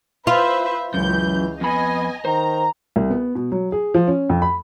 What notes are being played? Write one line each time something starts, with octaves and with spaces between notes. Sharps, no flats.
F4 B4 C5 E5
C#2 F#2 E3 G6
F2 B3 D#5 G#5 B5
D#3 C5 A#5
C2
B3
B2
F#3
G#4
F3
C#4
F2
B5